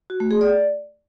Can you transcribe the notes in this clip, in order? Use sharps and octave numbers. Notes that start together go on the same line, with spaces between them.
F#4
A3
G#4
D5